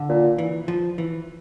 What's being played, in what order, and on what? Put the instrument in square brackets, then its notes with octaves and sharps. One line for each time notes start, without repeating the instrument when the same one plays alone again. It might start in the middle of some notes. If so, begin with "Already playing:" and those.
Already playing: [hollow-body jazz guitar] D3
[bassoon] A#2
[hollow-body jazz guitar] E3
F3
E3